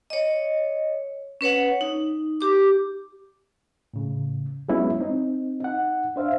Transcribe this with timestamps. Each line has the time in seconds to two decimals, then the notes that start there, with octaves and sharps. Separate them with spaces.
0.10 C#5 D#5
1.41 C#4 B4 C#5 F#5
1.81 D#4
2.41 G4 D6
3.94 A2 C#3
4.69 F#3 G#3 B3 C#4 E4
5.00 C4 D#4
5.60 D#4 F#5
6.16 D4 C5 E5 F5